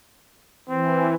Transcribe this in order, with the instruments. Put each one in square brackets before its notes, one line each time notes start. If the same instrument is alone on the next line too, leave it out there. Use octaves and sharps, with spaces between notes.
[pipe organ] E3 [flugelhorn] C4